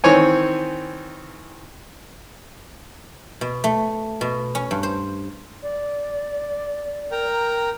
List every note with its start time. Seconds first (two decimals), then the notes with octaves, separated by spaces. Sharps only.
0.04 D#3 E3 C4 C#5 G#5
3.41 B2
3.64 A3
4.21 B2
4.55 C#4
4.71 G2
4.83 C5
5.63 D5
7.11 A#4 G5 A#5